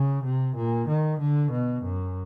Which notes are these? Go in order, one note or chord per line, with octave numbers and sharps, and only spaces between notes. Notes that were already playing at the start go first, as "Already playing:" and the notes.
Already playing: C#3
C3
A#2
D#3
D3
B2
F#2